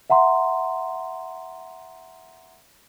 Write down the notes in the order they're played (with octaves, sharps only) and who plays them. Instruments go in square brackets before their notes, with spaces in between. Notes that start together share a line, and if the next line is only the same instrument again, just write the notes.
[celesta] E5 F#5 A#5 C6